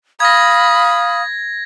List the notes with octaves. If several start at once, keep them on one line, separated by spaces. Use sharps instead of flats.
F5 B5 D#6 G#6 A#6